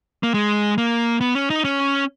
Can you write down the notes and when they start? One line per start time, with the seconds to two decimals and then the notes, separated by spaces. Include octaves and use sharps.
0.23 A#3
0.34 G#3
0.78 A#3
1.21 B3
1.35 C#4
1.50 D#4
1.65 C#4